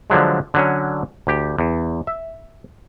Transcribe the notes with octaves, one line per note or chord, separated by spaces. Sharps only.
D3 F3 F#3 G#3
D3 F#3 C#4
D2 G4
E2
E5